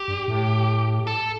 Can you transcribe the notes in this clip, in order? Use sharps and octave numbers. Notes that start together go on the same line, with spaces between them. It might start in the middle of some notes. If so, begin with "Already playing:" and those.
Already playing: G4
G2
A2
A4